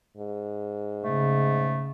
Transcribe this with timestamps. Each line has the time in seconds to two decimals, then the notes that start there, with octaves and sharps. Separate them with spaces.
0.17 G#2
1.04 C#3 A3